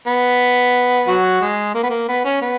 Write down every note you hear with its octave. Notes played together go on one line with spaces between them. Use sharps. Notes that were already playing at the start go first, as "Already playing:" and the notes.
B3
F#3 F#4
G#3
A#3
B3
A#3
B3
C#4
B3